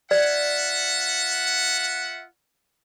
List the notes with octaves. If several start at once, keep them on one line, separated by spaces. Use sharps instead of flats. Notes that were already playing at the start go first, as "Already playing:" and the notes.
F4 D5 E5 F#5